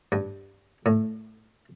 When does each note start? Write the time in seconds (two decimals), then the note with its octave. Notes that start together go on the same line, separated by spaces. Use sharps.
0.12 G2
0.86 A2